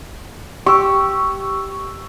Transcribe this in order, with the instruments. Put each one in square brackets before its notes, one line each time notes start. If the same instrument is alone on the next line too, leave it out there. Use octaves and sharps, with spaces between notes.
[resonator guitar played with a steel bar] G4 [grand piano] C#6 E6